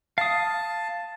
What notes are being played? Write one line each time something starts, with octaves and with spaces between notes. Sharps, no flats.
F5 A5 D#6